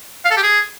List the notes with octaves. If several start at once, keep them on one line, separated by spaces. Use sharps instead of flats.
F5
A4
G4
G#4